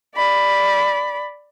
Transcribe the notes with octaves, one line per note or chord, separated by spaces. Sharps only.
D5 B5